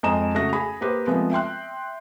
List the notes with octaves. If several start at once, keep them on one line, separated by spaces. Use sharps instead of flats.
F2 G#3 D#5 A#5 D#6 E7
C#3 A3 F#4 A#6
G#4 B5
A#3 G4 B4 C5
F3 G#3 A3 B3 C4
E5 G5 C6 F#6